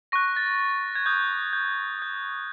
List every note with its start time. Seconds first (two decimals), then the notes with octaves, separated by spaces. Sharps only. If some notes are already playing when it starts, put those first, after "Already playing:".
0.12 C#6 F#6 A#6
0.36 A6
0.95 G#6
1.06 D#6 G6
1.53 G6
1.99 D#6 G6